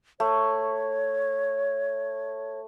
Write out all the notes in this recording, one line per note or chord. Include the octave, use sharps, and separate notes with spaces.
A3 C#5